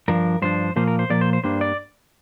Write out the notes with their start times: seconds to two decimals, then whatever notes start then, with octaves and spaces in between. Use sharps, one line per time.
0.08 G2 F3 D4 A#4
0.42 G2 F3 D4 C5
0.76 A#2 F3 A#3 C5
0.88 A#4
0.99 C5
1.10 A#2 F3 A#3 D5
1.21 C5
1.33 C5
1.44 G2 G3 A#3 D4 C5
1.61 D5